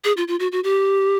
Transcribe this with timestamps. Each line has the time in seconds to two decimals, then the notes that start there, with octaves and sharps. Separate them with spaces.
0.04 G#4
0.17 F4
0.28 F4
0.40 F#4
0.52 F#4
0.64 G4